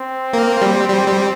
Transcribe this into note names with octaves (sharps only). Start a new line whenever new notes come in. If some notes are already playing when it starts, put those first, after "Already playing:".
Already playing: C4
A#3
G3
G3
G3